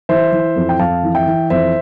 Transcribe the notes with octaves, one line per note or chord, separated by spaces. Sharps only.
E3 C5 E5
E3
F2
G5
F2 F5 A5
E3
E5 G5
E3
F2 C5 E5